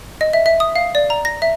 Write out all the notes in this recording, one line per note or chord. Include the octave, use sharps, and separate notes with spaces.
D#5
E5
E5
D#6
F5
D5
A#5
A#6
E5